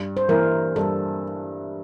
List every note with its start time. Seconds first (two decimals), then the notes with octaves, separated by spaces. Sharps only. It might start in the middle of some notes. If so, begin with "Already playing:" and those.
Already playing: G2
0.17 C5
0.29 E3 A#3 E4 A#4
0.75 G2 A4